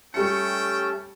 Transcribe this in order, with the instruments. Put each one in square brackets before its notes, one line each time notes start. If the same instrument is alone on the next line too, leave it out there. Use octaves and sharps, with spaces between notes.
[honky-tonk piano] G3 C#7 [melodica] A3 C#4 A5 [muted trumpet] G5